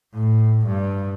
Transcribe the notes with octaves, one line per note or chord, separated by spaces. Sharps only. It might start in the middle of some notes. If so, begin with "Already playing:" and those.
A2
G2